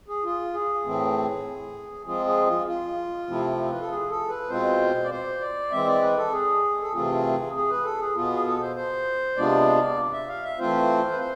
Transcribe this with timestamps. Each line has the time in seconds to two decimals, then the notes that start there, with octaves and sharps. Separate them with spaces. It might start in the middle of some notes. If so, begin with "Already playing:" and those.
0.08 G#4
0.23 F4
0.54 G#4
0.84 A2 E3 A3 C4
2.06 F3 G#3 C4 F4 G#4
2.26 G#4
2.47 F4
2.67 F4
3.27 C3 F3 A3 C4 E4
3.71 B4
3.80 A4
3.89 G#4
4.09 A4
4.29 B4
4.49 B2 G#3 C4 F4 C5
5.04 D5
5.11 C5
5.40 D5
5.71 E3 G#3 C4 E5
5.86 D5
6.02 B4
6.17 A4
6.32 G#4
6.82 A4
6.93 C3 E3 A3 C4 F4 G#4
7.54 G#4
7.70 B4
7.84 A4
7.99 G#4
8.15 B2 B3 F4
8.30 G#4
8.46 A4
8.61 C5
8.76 C5
9.37 C3 G#3 B3 D4 F4 D5
10.13 E5
10.28 F5
10.43 E5
10.59 E3 A3 C4 F4 C5
11.11 B4
11.20 C5